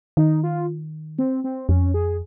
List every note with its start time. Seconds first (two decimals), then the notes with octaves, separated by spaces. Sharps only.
0.17 D#3 D#4
0.43 F4
1.18 C4
1.44 C4
1.69 F2 C#4
1.94 G#4